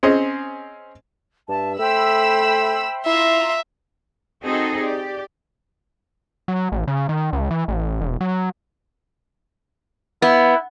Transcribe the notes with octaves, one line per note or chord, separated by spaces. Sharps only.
C4 C#4 G#4 C5 D#5
G2 E5 A5
A3 C5 E5 G5 B5 E6
E4 F4 E5 A#5 C6
C4 D#4 F#4 G#4 A4
G4 D5
F#3
A1
C#3
D#3
C#2
E3
A1
E1
F#3
B3 E4